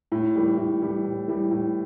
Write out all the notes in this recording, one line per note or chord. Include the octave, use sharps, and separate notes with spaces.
A2
E3 G3
A2
E3 G3
A2
E3 G3
A2